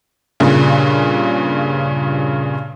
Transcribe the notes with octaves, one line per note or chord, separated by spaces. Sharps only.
G2 A#2 C#3